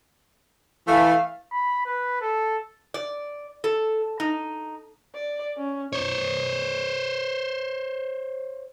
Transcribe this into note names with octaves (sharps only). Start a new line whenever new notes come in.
E3 A3 F5
B5
B4
A4
D5
A4
D#4
D5
C#4
C5 C#5